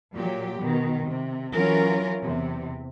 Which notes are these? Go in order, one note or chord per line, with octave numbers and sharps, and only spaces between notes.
A#2 F#3 G4
B2 D#3
C3
E3 F#3 C#4 F4 A#4
E2 C3